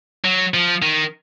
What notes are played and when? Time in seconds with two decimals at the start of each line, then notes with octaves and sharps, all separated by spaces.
0.24 F#3
0.54 F3
0.82 D#3